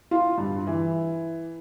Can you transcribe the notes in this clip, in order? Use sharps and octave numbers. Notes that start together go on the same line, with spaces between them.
F4
G2
E3